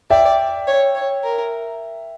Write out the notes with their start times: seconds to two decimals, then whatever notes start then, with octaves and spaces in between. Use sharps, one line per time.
0.10 D5 E5 G5
0.67 C#5
0.95 C#5
1.23 A#4